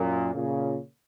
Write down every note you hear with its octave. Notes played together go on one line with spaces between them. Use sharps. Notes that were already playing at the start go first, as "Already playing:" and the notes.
Already playing: F#2 A#2
A#2 C#3